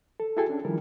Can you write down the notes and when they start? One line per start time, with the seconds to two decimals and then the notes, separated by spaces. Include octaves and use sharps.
0.20 A4
0.37 E4 F#4 G#4 A4 G5 G#5
0.49 C#4 D4
0.65 D#3 F3 G3 E4 A#4